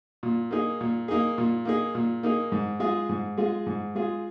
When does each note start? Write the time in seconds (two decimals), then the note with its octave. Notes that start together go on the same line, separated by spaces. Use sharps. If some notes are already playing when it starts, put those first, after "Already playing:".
0.23 A#2
0.51 A#3 D#4 G#4
0.81 A#2
1.08 A#3 D#4 G#4
1.38 A#2
1.65 A#3 D#4 G#4
1.95 A#2
2.23 A#3 D#4 G#4
2.52 G#2
2.80 G#3 F4 G#4
3.09 G#2
3.37 G#3 F4 G#4
3.66 G#2
3.95 G#3 F4 G#4